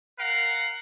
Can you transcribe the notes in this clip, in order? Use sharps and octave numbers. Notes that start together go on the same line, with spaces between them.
A#4 F5 F#5